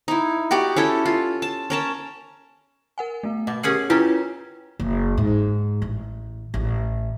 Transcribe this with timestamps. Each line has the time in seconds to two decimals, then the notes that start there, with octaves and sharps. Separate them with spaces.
0.08 D#4 E4
0.51 F#4 G4 D5 D#5
0.76 C#4 E4 A4
1.06 F4
1.42 A5
1.70 C#4 A#4 A5
2.98 A#4 F#5 G#5
3.23 A3 B3
3.47 B2 D#5 D6
3.63 C#4 G4 G#4 A#4 F#5 C7
3.90 C#4 E4 F4 G4 B4 A#5
4.79 F#1
5.17 G#2
5.82 A1
6.54 A1